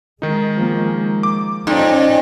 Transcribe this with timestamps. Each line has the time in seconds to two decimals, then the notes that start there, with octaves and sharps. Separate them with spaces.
0.22 D#3 G#3 D#4
0.56 F3 A#3
1.23 D6
1.67 F2 C#4 D#4 D5